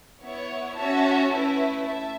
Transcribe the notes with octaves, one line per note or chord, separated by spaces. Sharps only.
B3 E4 C#5
C#4 F#4 C#5 E5 A5
A3 C#4 E4 B4 E5
E5 A5